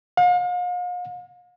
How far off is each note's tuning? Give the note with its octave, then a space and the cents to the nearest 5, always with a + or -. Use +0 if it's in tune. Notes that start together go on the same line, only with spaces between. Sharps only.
F5 +40